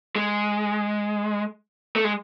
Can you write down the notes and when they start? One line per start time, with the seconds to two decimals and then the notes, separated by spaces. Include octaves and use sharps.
0.16 G#3
1.96 A3
2.04 G#3